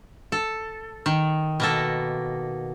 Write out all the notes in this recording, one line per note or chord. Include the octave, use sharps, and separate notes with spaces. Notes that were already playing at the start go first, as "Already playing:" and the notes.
A4
D#3
B2 A#3 A4